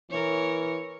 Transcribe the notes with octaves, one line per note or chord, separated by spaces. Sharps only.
E3 A#4 C#5